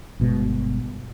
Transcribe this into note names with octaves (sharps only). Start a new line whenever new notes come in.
G1 B2 G#3